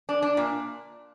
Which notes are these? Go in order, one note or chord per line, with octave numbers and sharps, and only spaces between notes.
D4
D4
A#2